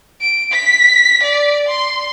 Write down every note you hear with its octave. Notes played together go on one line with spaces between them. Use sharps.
D7
B6
D5
C6